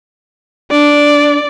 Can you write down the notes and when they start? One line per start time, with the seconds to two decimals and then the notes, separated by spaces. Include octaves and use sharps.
0.71 D4 D5